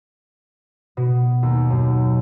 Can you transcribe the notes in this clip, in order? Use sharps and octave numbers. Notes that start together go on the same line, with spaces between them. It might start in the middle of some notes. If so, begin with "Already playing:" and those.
B2
D#2
F#2